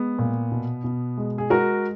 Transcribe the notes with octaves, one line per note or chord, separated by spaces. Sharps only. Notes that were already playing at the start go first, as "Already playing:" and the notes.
Already playing: G#3 B3
A#2
B2
B2
G#3
G#4
G#3 F#4 A#4